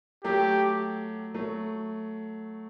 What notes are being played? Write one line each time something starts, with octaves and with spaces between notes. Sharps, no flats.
F#3 A3 G4
F#3 A3